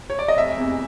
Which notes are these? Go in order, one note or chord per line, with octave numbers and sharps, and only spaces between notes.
C#5
D5
D#5
F1 E5
E2 C3